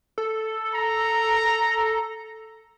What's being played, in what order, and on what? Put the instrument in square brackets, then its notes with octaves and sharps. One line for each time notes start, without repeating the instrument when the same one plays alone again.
[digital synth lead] A4
[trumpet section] A#5